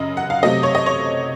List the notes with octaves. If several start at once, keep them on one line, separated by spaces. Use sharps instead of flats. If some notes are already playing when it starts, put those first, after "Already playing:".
Already playing: F#2 C#3 D#5
F#5
F5
C3 F#3 A3 C4 D#5
C#5
D#5
C#5